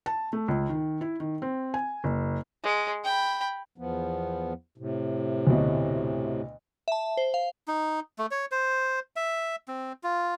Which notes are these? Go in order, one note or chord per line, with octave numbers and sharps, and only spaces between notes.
A5
A3
C#2
D#3
E4
D#3
C4
G#5
F#1
G#3
G5 B5
E2 F3 B3
A2 C3
D2 B2
E5 A5
C5
F5
D#4
A3
C#5
C5
E5
C4
F4